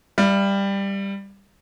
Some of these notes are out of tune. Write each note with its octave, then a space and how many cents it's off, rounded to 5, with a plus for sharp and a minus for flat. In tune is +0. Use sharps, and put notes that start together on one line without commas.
G3 +10 E5 +45